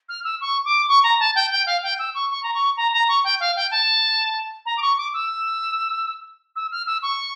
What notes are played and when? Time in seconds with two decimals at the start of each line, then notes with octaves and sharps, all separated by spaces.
0.09 F6
0.24 E6
0.41 C#6
0.65 D6
0.88 C#6
1.03 A#5
1.19 A5
1.35 G5
1.51 G5
1.66 F5
1.83 G5
1.99 E6
2.14 C#6
2.30 C#6
2.43 A#5
2.54 C#6
2.77 A#5
2.92 A#5
3.08 C#6
3.24 G5
3.40 F5
3.56 G5
3.71 A5
4.65 A#5
4.77 D6
4.82 C#6
4.97 D6
5.14 E6
6.56 E6
6.71 F6
6.86 E6
7.02 C#6